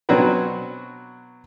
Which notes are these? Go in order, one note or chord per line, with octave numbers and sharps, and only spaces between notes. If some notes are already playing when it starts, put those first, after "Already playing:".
B2 F#3 C4 D4 F#4 B4